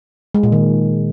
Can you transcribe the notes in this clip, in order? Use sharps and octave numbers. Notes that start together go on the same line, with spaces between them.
G#3
A#2
D#3